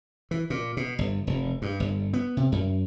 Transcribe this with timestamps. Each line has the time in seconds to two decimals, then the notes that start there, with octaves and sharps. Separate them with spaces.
0.31 E3
0.50 A#2
0.77 B2
0.99 G1
1.27 F1
1.62 G2
1.80 G1
2.13 B3
2.37 C3
2.52 F#2